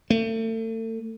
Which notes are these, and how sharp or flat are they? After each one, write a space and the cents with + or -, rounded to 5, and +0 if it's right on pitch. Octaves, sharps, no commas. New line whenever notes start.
A3 +35